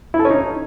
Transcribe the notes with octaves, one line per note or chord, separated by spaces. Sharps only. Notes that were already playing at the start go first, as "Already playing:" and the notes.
E4
A4
C#4
D#4